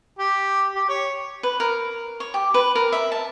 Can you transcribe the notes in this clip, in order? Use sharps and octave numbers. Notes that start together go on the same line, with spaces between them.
G4
G4
C#5
B4
A#4
C#5
G4
B4
A#4
E5
A5